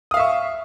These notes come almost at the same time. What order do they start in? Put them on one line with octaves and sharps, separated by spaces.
D#6 F5 E5 C#6